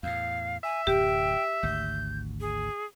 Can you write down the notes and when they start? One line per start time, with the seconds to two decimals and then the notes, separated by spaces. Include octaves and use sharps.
0.03 E2 A2 F5
0.63 E5 G#5
0.87 D1 F#2 G4 G5
1.63 G#1 D2 G6
2.40 G#4